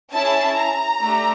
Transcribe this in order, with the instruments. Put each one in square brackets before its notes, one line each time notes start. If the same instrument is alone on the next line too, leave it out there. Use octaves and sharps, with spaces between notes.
[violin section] C#4 E4 G#4 A5
A#5
A3 D4 G4